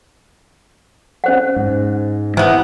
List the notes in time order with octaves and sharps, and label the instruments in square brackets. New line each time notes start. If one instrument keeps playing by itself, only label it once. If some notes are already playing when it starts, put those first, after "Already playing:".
[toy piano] C#4 C5 F#5
[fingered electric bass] G#2
[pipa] C3 B3 [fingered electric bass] E3